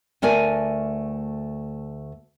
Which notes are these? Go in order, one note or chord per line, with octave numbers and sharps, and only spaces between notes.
D2 A3 A#4 D5 G#5